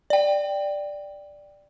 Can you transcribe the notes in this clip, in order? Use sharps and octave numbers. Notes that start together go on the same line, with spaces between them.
D5 G5